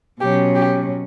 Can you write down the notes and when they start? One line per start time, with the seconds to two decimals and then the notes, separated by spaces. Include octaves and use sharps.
0.20 B2 F#3 C#4 G4
0.55 G4